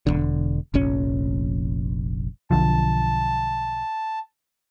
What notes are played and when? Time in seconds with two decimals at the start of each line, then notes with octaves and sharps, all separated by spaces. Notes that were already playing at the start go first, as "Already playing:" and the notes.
0.07 E1 B1 D3
0.74 F1 A#1 C#4
2.51 B1 D3 F3 A5